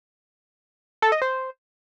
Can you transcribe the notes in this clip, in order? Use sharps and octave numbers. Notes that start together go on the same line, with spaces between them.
A4
D#5
C5